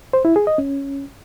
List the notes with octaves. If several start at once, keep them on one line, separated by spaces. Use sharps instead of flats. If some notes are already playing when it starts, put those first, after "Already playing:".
C5
E4
G#4
D#5
C#4